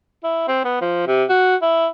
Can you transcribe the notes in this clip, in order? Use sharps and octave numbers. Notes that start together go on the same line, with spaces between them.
E4
C4
B3
F3
C3
F#4
E4